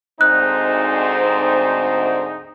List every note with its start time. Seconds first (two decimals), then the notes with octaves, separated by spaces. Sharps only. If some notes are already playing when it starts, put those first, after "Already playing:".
0.21 D2 G#2 C4 D#4 F#6